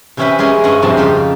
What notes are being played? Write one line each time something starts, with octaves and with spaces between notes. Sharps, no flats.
C3 E3 C#4 E4 G4 B4
G#3 C#4 G4 G#4 A#4 D5
G2 C#4 C#5 D#5 F#5
F2 G#2 C3 G3 A5
C#3 D#4 F4 G4